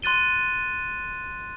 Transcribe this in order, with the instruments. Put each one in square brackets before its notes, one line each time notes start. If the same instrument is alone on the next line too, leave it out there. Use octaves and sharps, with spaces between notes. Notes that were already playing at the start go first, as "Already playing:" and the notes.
[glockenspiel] C6 F#6 A6 D#7 G7